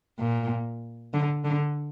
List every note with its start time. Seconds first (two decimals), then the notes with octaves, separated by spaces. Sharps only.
0.19 A#2
1.14 D3
1.44 D3